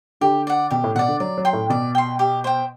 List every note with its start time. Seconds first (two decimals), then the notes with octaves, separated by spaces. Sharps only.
0.21 D3 G4
0.47 D5 F#5
0.71 B2 G4
0.84 A2
0.95 B2 D5 F#5
1.08 D3
1.20 F#3 D5
1.38 F#3
1.45 G5 C6
1.53 A2
1.70 B2 D5
1.95 G5 C6
2.19 G4
2.44 C5 G5